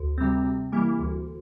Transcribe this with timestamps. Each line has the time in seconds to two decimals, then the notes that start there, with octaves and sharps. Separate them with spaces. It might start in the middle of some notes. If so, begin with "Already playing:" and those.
Already playing: D2
0.18 C3 G3 C4
0.45 C3
0.72 E3 G3 A#3 E4
0.99 D2